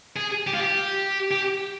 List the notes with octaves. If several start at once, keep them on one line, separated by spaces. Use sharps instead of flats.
G#4
G4
F4
G4
G4